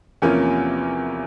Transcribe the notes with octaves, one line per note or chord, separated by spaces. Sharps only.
E2 C3 F3 A#3 C#4